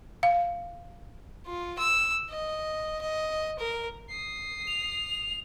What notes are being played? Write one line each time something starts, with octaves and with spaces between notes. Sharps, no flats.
F5
F4
E6
D#5
D#5
A#4
D#6 C7
F7